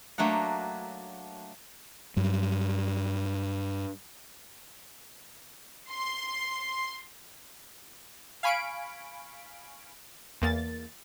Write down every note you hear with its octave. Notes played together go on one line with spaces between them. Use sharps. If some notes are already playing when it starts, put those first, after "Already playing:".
F#3 A3 A#3 D4 F#5
G2 F#3
C6
F5 G#5 B5 C#6 D7
E2 A#3 A6